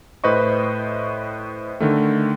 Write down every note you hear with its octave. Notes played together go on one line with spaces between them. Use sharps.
A2 B4 C5 D#5 C#6
D3 D#3 A3